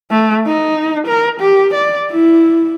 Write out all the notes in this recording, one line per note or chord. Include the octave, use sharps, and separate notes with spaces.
A3
D#4
A#4
G4
D5
E4